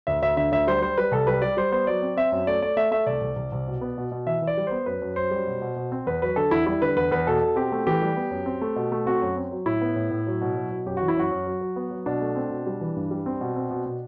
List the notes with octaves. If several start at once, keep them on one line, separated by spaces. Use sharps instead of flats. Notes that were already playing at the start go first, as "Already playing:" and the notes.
D2 E5
D2 E5
D3 E5
D2 E5
G3 C5
G3 C5
G3 B4
C2 A4
G3 B4
G3 D5
G3 C5
B3 C5
F#3 D5
C4
C4 E5
F#2
A3 D5
A3 D5
A3 E5
A3 E5
C2 D5
C2
C2
C2
B2
B3
B2
B2
E3 E5
E3
D5
G3
B3 C5
F#2 B4
F#2
F#2 C5
G3
B2
B2
B2
C4
E2 B4
F#3 B4
D3 A4
E2 E4
G3 E4
D3 B4
E2 B4
E2 B4
B2 A4
B2
C4 G4
A3
E3 G4
G3
B3
F#2
C4
A3
B2
A3
C4 F#4
F#2
C4
F#3
A2 E4
B3
A2
A2
F#3
B2
F#3
B2
F#2 G4
E3 F#4
E4
F#2 F#4
F#2
F#3
F#3
B3
F#3
B2 D4
A3
C4
B2
G3
E3
G2
G3
C4
B2
C4
B2
B2